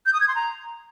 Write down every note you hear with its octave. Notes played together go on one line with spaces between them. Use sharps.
G6
D#6
G#6
C6
A#5